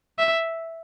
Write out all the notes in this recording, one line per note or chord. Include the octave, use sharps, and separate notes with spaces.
E5